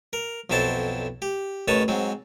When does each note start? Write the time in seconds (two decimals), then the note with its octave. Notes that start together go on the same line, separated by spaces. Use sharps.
0.13 A#4
0.50 B1 F2 F#3 E4 C5 A5
1.22 G4
1.68 A1 D#3 B4 C#5 A5
1.88 G#2 F#3 C4